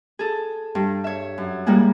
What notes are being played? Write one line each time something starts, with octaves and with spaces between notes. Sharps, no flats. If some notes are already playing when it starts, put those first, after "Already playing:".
G#4 A4
G2
C#5 E5
F#2
G3 G#3 A#3 E4 G#4